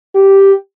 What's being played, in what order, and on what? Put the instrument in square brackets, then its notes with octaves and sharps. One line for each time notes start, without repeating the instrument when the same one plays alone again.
[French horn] G4